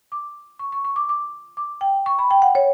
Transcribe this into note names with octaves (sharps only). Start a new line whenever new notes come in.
D6
C#6
C#6
C#6
D6
D6
D6
G5
C#6
B5
G5
F#5
C#5